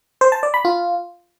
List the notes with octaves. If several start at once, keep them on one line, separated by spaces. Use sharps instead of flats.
C5
A5
D5
B5
F4